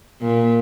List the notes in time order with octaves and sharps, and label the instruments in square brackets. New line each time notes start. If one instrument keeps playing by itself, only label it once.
[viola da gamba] A#2